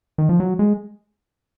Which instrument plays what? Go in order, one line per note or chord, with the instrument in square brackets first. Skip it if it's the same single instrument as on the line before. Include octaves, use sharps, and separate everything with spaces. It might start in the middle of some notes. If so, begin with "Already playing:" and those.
[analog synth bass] D#3
F3
F#3
G#3